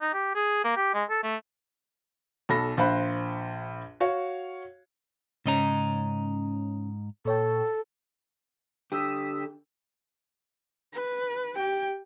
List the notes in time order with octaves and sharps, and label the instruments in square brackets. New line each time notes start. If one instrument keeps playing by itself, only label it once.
[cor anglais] D#4
G4
G#4
A#3
G4
G#3
A4
A3
[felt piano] B1 A4 B5 A#6
A#1 C5 F5 B5 F#6
F#4 C#5 F5
[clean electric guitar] G#2 D#5 A#5 [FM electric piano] C#3 C#4
[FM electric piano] A#2 C#5 G5 [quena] A4
[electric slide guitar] D3 G4 [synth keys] D#6 E6 B6
[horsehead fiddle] B4
G4 G5